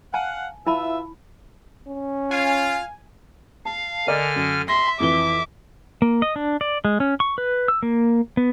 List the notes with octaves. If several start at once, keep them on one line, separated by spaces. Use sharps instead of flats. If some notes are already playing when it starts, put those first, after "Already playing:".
F5 F#5 G#5 A5
E4 F4 B4 E5 A5 B5
C#4
F4 F5 G#5
F5 A5
D3 A#4 D5 D#5 G#5 F6
F#2
E5 C6 A#6
F2 E3 D6 G7
A#3
D#5
D4
D5
G#3
C#4
C#6
B4
E6
A#3
B3